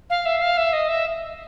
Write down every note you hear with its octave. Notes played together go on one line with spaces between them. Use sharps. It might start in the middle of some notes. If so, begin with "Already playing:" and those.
F5
E5
F5
E5
D#5
E5